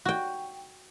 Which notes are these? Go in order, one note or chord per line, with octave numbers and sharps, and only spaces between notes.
F#4 G5